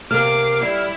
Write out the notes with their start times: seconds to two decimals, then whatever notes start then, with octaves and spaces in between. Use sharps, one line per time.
0.11 C3 A#3 D6 F6 C7
0.62 G3 E4